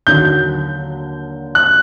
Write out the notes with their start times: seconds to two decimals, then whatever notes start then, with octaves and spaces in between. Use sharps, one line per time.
0.07 D#2 D3 F#3 G6
1.55 F#6